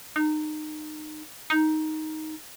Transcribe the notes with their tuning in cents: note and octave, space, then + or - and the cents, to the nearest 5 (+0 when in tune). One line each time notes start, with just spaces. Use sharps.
D#4 -25
D#4 +5